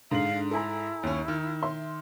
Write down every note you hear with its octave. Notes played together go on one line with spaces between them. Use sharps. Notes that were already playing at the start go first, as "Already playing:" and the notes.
G#2 D3 F5 F#7
E4 A4 G#5 A#5
D#2 C#4
D#3
E5 C6